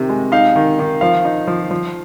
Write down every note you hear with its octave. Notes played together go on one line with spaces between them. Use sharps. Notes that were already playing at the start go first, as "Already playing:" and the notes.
Already playing: C3 D#3
G#3
D#4 F5
D#3
D#3
F3 F5
D#4
F3
F3